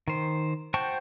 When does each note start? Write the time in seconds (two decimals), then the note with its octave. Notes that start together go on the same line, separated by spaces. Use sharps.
0.08 D#3 C5
0.74 F#4 C5 G5 A5 C#6